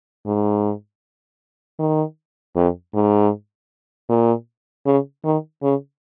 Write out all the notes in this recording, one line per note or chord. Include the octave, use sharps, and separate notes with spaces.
G#2
D#3
F2
G#2
A#2
C#3
D#3
C#3